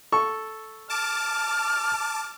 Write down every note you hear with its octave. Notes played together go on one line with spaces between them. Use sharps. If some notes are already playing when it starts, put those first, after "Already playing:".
A4 C#6
A5 D6 F6